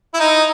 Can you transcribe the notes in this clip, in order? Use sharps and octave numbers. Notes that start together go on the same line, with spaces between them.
E4
D#4